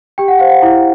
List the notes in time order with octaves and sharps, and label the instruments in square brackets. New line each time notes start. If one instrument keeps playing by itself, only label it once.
[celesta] G4 G5
F#5
C5 F5
F#5
E4